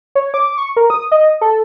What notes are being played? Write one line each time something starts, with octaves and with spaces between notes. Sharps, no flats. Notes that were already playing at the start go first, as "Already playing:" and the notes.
C#5
D6
C#6
A#4
D#6
D#5
A4